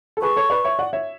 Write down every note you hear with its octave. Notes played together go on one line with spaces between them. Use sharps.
A4
G#4 B4 C#6
A4 C#5
B4 D5
C#5 E5
D5 F#5
C#5 E5